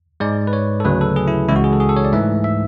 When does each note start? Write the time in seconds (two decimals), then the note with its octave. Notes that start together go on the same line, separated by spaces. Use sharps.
0.20 G#2 G#3 D5
0.47 B4
0.53 C#5
0.80 A4
0.84 D2 C#3 F#3 B4
1.01 A4
1.16 G#4
1.28 E4
1.48 C#2 C#3 E3 G#3 E4
1.56 F#4
1.64 G#4
1.73 A4
1.80 G#4
1.89 A4
1.97 C#5
2.05 D5
2.12 G#2 E3 A3 E5
2.44 E5